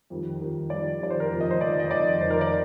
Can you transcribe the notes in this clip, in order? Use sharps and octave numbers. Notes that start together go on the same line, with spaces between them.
F2 D#3 G3
F2 D#3 G3
F2 D#3 G3 D5
F2 D#3 G3 D5
C5
A#4
F1 F2 D#3
D#5
C5
F1 F2 D#3 D5
D#5
F1 F2 D#3 D5
F1 F2 D#3 C5
A#4
D5